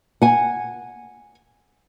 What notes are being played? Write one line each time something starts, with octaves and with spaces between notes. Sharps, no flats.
F#5 G#5